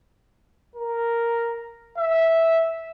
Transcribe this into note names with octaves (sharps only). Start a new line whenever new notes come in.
A#4
E5